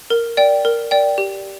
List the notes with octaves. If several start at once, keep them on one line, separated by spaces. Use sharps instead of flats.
A#4
D5 G5
A#4
D5 G5
G4